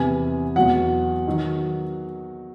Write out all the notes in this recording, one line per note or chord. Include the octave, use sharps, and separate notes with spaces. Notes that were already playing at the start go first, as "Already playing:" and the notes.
Already playing: E2 C3 E3 G#5
E2 B2 F#3 F#5
D#3 F#3